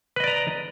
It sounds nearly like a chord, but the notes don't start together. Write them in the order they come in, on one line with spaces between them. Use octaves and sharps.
B4 D#5 D5 A#5